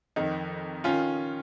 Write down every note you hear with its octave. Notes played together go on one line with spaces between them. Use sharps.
F2 D#3 D#4
D#3 C#4 F4